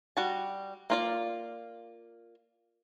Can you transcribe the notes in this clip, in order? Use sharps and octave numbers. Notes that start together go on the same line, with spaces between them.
G3 F#4 A5
A#3 F4 D5